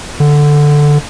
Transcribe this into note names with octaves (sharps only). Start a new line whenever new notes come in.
D3